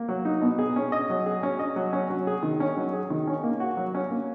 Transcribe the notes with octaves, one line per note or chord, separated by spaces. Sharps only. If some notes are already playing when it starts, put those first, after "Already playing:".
Already playing: A#3
F#3
D#4
B2
G#4
C#4
D#5
F#3
G#4
C#4
D#5
F#3
C#4
F#3
G#4
D#3
C#4
F#3
G#4
D#3
C#4
A#3
F#4
F#3
C#4
A#3